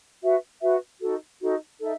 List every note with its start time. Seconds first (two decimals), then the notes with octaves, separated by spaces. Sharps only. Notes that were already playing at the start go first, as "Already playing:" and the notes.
0.21 F#4 B4 E5
0.61 F#4 B4 E5
1.00 D#4 F#4 A4
1.40 D#4 F#4 A4
1.78 D#4 A4 E5